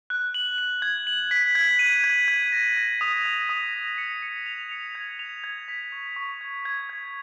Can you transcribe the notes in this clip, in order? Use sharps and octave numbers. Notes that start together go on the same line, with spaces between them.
F#6
F#7
F#7
G#6
F#7
B6
G#6
D#7
G#6
G#6
A#6
A#6
D#6
A#6
D#6
A#6
C#7
C#7
F7
C#7
G#6
F7
G#6
B6
C#6
C#6
G#6
G#6
G#6